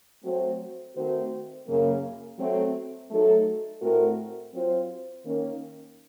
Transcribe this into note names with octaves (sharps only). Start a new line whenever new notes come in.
F#3 A3 C4 F#4 C5
D#3 A3 C4 F#4 C5
F#2 C#3 F#3 A#3
F#3 A3 C4
F#3 A3 D#4 A4
A2 A3 C4 F#4 A#4
F#3 C4 F4 C5
D#3 A#3 C#4